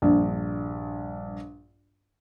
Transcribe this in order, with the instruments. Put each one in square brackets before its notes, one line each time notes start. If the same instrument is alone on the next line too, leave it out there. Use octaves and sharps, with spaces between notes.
[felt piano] A#1 G2